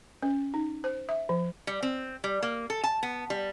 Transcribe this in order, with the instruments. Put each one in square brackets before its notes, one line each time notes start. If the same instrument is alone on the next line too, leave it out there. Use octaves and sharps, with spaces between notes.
[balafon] C#4
D#4
C5
E5
F3
[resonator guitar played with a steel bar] G3
C4
G3
A#3
A4
A5
B3
G3